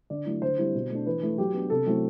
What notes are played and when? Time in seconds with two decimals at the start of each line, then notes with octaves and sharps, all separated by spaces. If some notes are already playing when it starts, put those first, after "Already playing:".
0.10 D3 D5
0.26 F#3 A3 E4
0.42 D3 C5
0.58 G3 C4 E4
0.75 B2
0.90 A3 D4
1.06 E3 B4
1.22 A3 E4
1.38 F#3 G4
1.54 B3 D4
1.70 C3 A4
1.86 F#3 A3 C4 E4